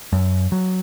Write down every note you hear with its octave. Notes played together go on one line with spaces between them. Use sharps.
F#2
F#3